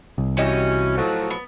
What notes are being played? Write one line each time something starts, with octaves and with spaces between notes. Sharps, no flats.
C2
E3 C#4 F#4 G4 D#5
A2 F3 F#3
B3